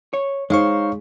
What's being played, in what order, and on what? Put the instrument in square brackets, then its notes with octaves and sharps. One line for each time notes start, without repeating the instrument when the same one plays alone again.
[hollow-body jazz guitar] C#5
[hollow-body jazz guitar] G#3 [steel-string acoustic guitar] D#4 C5 [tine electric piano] C#5 F5 C#6